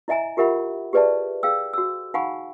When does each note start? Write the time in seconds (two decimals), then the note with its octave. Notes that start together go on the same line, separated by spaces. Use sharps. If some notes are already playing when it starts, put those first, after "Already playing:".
0.08 E4 D#5 E5 G#5 A#5
0.37 F4 G4 A#4 E5 F#5 B5
0.93 G4 G#4 B4 D5 E5 A5
1.43 G#4 F5 G5 E6
1.74 F#4 E6
2.14 D#4 F5 F#5 G#5 B5 C#6